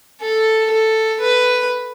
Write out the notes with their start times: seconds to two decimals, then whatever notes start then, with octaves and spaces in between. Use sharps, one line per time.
0.21 A4
0.71 A4
1.21 B4